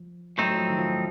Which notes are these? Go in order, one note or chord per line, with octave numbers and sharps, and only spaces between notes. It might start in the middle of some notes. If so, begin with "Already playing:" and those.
Already playing: F3
A2 F#3 A3 C4 D#4
F#3
F3
D#3
F3